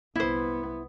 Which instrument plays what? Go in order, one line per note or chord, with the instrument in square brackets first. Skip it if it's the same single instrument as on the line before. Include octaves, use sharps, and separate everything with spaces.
[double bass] C2 B3 [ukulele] E4 C5